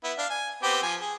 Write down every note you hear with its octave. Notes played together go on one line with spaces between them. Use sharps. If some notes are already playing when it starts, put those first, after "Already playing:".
B3 E4
D4 F5
G#5
B3 C4 G4
F3 G#5
G#4